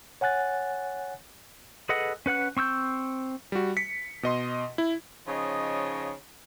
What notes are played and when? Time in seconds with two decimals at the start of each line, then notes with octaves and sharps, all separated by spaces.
0.21 C#5 F#5 G#5 F#6 A6
1.89 G#4 A4 B4 D#5 F#5
2.26 C#4 B4 F#5 F#6
2.57 C4 C#6 E6 G6
3.52 G3 F#4
3.77 B6 C#7
4.23 B2 D#5 C6
4.78 E4
5.27 C#3 F3 D#4 C#5 D#5